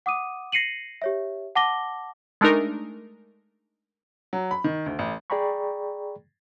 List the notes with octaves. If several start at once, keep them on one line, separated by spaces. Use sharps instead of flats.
F#5 D6 D#6 D#7
A#6 C7 C#7 D#7 F#7
G4 C#5 E5
F#5 A5 D6 A#6 G7
G#3 A3 D4 D#4 A#4
F#3
B5
D#3
D2
A1
G#4 D5 G5 A#5 B5 C#6